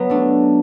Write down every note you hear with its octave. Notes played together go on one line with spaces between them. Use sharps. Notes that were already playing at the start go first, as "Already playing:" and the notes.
Already playing: F#3 B3
A3 D4